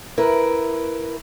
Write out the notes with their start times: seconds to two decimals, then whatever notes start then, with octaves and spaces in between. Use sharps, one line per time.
0.18 E4 A#4 B4